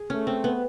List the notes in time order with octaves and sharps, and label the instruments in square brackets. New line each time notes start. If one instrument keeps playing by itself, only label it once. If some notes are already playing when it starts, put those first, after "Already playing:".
Already playing: [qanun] G#4
[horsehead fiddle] A3 [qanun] C#4
[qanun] C4
B3